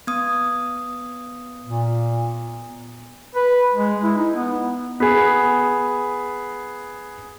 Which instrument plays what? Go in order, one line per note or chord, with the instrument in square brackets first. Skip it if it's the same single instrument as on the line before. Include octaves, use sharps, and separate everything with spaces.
[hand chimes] B3 D#6
[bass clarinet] A#2
[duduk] B4
G#3
E4
D#4
B3
[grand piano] B3 G#4